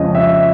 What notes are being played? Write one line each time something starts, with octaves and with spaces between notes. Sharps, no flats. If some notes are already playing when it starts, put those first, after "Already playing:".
Already playing: F2 C#3 F3 G#3 C#4 D#5
E5